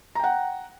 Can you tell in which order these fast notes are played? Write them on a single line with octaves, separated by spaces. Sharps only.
A#5 G5 F#5